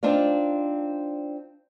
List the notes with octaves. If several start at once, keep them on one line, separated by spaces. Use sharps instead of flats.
C4 D4 D#4 F4 D5